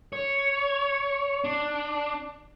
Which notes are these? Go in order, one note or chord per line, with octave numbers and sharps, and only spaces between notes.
C#5
D4